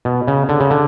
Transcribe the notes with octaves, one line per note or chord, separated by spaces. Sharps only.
B2
C#3
D3
C#3
D3